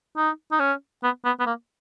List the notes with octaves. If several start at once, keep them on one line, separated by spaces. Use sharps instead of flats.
D#4
D#4
C#4
B3
B3
B3
A#3